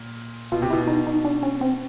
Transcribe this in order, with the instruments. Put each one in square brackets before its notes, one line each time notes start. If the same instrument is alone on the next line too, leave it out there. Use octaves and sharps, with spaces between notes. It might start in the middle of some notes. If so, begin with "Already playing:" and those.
Already playing: [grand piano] A#2
[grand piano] B2 [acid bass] F4
[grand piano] C3
[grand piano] B2 [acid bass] E4
[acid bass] D#4
D#4
D4
C#4
C4